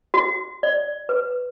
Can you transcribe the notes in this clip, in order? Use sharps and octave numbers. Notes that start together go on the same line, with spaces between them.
F#4
D5
B4